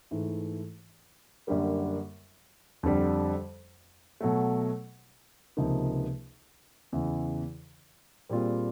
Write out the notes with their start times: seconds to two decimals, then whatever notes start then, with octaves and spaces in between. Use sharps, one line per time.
0.11 G#2 E3 A3
1.47 F#2 D3 G3 A#3
2.83 F2 D3 G3
4.21 B2 F#3 A3
5.57 C#2 C3 F3 A#3 D#4
6.93 E2 C#3 E3
8.29 A#2 G3 C4 F4 G#4